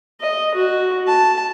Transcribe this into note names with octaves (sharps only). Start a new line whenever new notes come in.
D#5
F#4
A5